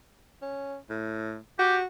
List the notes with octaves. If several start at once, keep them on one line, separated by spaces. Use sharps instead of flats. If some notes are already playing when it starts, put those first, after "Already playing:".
C#4
A2
F#4 G4